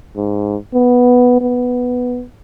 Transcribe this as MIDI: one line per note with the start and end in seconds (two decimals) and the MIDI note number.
0.16 0.56 44
0.74 1.37 59
1.41 2.24 59